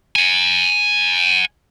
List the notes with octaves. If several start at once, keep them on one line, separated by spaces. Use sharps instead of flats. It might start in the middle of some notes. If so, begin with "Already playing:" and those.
F#5 G#5